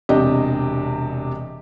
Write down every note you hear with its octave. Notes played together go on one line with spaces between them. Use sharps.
E1 C3 D4 G4 D#5